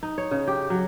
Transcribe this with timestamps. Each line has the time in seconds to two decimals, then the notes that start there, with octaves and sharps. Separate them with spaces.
0.03 D#4
0.18 C#5
0.31 C#3
0.47 G4
0.70 F#3